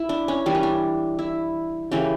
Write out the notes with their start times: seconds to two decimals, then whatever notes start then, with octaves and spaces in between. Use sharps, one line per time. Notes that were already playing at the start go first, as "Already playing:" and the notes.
Already playing: E4
0.09 D4
0.28 C#4
0.46 E3 G3 A#3 D4
0.55 C#4
0.63 D4
1.19 E4
1.92 C#3 E3 A#3 G4